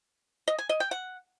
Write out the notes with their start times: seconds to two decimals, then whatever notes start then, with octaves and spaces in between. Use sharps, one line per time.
0.48 D#5
0.58 G#5
0.69 D#5
0.80 G5
0.91 F#5